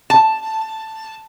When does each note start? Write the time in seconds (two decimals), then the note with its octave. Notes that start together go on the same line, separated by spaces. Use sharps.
0.10 A5